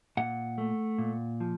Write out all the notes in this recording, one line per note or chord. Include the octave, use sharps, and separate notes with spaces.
A#2 F#5
A3
A#2
F3